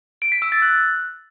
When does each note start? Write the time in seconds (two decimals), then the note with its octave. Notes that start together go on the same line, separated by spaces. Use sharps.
0.22 D7
0.32 B6
0.42 E6
0.52 A6
0.62 F#6